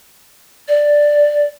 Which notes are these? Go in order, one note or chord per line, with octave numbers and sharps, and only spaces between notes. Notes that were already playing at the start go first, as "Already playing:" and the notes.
D5